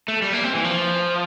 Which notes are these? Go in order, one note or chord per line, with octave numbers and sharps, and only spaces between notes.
A3
G3
A#3
C4
E3
F3